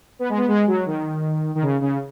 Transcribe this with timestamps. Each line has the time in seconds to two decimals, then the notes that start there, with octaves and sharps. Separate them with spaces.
0.19 B3
0.29 G#3
0.38 B3
0.48 G#3
0.67 F#3
0.86 D#3
1.55 D#3
1.62 C#3
1.81 C#3